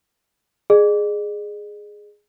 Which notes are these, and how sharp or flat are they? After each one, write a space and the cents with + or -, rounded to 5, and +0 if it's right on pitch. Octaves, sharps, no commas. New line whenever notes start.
G#4 +0 D#5 -45